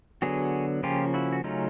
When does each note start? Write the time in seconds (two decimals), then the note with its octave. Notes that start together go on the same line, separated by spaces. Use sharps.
0.22 D3 F#3 B3 F#4 G#4
0.83 C#3 F3 A#3 C#4 F4 G4
1.14 E4 F#4
1.33 F#4
1.44 C#3 F#3 A3 C#4 D#4 F4